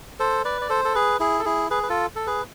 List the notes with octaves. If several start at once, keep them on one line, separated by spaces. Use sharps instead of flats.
A4 C5
B4 D5
D5
A4 C5
A4
G#4 B4
E4 G#4
A4
E4 G#4
G#4 B4
B4
F4 A4
A4
G#4 B4